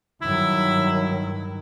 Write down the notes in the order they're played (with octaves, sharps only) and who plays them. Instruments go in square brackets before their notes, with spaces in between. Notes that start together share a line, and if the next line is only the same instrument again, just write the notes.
[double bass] G2 D#3 [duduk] F#3 [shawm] E4